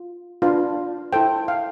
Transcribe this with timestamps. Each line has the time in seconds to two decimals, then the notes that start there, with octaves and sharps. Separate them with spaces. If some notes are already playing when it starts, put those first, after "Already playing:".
Already playing: F4
0.42 D4 F4 B4
1.13 E4 A4 C5 G5
1.48 F5